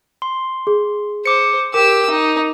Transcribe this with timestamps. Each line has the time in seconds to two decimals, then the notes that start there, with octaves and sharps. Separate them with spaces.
0.22 C6
0.67 G#4
1.26 C5 D6 C#7
1.74 G4 A#4 D6 E6
2.10 D#4